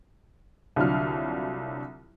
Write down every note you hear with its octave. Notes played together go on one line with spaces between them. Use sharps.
C2 D3 F#3 F4 F6